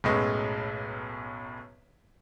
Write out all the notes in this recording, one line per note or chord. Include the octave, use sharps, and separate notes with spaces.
B1 F#2 A2 G#3 B4 D#5